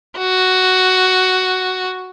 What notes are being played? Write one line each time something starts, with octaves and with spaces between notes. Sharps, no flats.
F#4